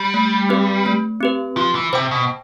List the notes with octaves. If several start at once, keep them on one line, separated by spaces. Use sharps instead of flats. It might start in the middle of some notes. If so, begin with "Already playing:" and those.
Already playing: G3
A3
C4 G4 B4
A3
C4 G4 B4
F3 F4
E3
C3 C5 G5
B2